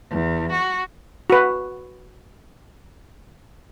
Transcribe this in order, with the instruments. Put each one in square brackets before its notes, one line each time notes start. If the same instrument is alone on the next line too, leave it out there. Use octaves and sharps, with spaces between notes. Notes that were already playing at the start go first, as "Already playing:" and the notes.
[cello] E2
F#4
[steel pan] F#4 B4